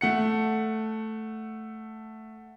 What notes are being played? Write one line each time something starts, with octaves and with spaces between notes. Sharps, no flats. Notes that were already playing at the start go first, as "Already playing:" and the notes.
A3 F#5 C#7